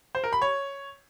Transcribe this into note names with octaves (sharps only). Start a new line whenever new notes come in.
C5
A#4
B5
C#5